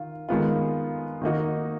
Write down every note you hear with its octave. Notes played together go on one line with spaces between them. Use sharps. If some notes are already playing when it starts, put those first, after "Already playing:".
Already playing: D#3 F4
D#3 G#3 B3 F4
D#3 A#3 D#4 F#4